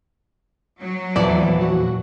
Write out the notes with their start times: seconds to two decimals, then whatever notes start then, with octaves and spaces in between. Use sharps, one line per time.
0.80 F#3
1.16 E2 A#2 E3 F3 E4 D5
1.61 F#4